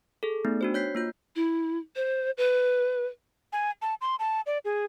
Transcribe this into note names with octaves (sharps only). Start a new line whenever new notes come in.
G#4 A4
A3 B3 D#4
D4 F#4 C5
C#5 G6 B6 C7
A#3 F4 G6
E4
C5
B4
G#5
A5
C6
A5
D5
G#4